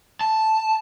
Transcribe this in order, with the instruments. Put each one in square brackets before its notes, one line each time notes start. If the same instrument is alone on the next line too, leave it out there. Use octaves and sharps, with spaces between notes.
[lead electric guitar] A5